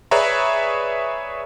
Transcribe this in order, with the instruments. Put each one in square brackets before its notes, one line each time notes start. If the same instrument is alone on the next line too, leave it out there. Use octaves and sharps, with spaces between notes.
[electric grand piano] G#4 B4 C#5 D5 E5 A#5